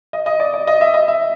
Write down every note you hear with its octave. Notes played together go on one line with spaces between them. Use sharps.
D#5
D#5
D5
D5
D#5
E5
D#5
E5